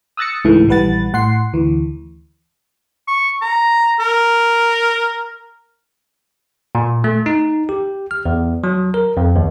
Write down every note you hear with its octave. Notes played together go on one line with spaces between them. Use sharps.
D#6 E6 F#6 A6 A#6 C#7
C#2 G#2 E3 A3
A#1 E3 G3 B4 F#5 A6
A2 F#5 C6 C7
D2 E3
C#6
A#5
A#4
A#2
A3
D#4
G4
F6
E2
F#3
A#4
F2
D#2